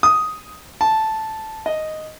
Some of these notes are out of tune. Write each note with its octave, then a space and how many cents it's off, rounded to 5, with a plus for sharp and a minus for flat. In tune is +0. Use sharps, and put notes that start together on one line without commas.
D#6 +5
A5 -5
D#5 +0